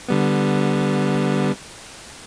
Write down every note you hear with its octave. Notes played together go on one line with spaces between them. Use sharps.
D3 G3 B3